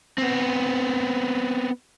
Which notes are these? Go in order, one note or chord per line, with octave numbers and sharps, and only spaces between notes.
B3 C4